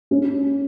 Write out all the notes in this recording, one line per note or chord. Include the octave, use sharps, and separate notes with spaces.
C#4